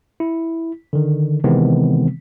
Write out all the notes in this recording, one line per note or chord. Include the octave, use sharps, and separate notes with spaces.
E4
D3 D#3
C3 D#3 E3 G#3 B3 C4